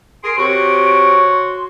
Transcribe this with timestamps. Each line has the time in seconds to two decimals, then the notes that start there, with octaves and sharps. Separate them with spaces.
0.24 G#4 A#4 C6 D7
0.38 C3 C4 F#4 C#5
1.27 C6